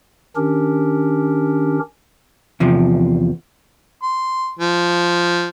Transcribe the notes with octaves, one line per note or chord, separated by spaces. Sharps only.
D#3 C#4 D4 G4 A#4
E2 C3 F3
C6
F3